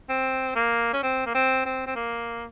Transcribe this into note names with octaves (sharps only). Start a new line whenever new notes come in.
C4
A#3
C#4
C4
A#3
C4
C4
C4
A#3